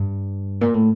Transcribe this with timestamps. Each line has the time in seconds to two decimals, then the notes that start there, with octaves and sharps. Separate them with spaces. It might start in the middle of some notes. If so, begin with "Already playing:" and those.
Already playing: G2
0.61 A#2
0.74 A2